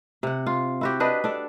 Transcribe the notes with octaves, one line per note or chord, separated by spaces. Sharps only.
C3 F#5
F4
E4 F#4 G4
D4 B4 D#5
D4 A4 D5